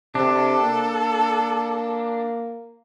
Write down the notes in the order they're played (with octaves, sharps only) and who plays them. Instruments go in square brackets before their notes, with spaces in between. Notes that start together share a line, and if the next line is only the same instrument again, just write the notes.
[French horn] C3 [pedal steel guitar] D4 [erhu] A4
[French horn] A#3